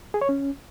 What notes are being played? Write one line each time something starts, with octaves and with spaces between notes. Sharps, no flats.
G#4
C#5
C#4